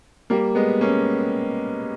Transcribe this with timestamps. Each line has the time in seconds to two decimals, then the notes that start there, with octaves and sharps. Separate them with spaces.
0.30 G3 A#3
0.55 G#3 B3
0.81 A#3 C#4